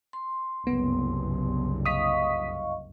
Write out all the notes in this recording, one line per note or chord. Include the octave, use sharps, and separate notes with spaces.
C6
F#1 C2 G2 B3
D#5 F5 C#6 D#6 B6